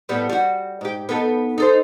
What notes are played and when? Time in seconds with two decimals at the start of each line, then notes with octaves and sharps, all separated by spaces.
0.09 A2 G3 B3
0.30 G3 F#4
0.81 G#2 G4
1.09 B3 D#4 A4
1.58 D#4 A4 C5